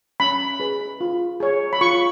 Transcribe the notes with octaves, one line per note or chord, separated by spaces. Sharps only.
C#4 B5
G#4 B4
F4
G#4 C#5
B5
F4 C#6